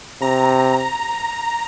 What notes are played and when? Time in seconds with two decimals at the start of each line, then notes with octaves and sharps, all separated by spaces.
0.22 C3 A#5